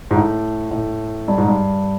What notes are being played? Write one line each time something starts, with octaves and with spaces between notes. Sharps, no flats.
G#2
A2
A2
G2
G#2
G2